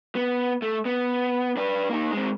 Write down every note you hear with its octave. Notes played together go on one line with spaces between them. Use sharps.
B3
A3
B3
D4 B4
A#3 D#4
G#3 C4